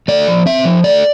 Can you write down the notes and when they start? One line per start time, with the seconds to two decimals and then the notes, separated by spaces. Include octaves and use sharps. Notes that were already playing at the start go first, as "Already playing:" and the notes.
0.08 A3 D5
0.28 F3
0.46 C4 E5
0.65 F3
0.84 A3 D5